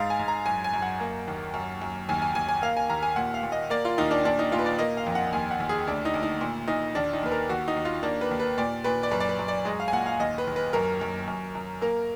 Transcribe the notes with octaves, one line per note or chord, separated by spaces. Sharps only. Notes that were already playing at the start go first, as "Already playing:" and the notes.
Already playing: G#2 F5
G#5
G#2
A#5
F#2 G#5
G#5
F#2
F#5
A#3
D#2
F#2
F#2
D#2 G#5
G#5
D#2 G#5
G#5
A#3 F5
G#5
D#2 A#5
G#5
A#2 F#5
F5
A#2
D#5
A#3 D5
F4
D#2 D#4
D4
A#2 D4
D#4
A#2 F4
B4
D5
A#3 D#5
F5
F2
F#5
D#2 G#5
F#5
D#2
G#4
D2 D4
D#4
D2
D#4
A#2
A#2 D#4
D#2 D4
D#4
D#2 B4
A#4
D#2 F#4
D#4
D#2
F4
A#3 D4
B4
D#2
B4
A#2 D5
A#2 B4
D5
F#2 B4
D5
B4
F#2
D5
G#3 D#5
F5
G#5
A#2 F#5
F5
D#2 D#5
B4
D#2
B4
F#2 A#4
F#2
F#2
F#2
A#3 A#4